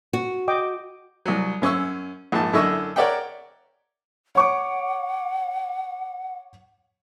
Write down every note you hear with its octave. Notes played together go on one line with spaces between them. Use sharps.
F#4
D#5 G5 D6
C2 F#3
F#2 C#4 C#6 E6
A#1 G#2 A5
F#2 D3 E4 D#5 C#6 E6
A#4 C#5 D5 E5 F#5 G5
C#5 F#5 C#6 D6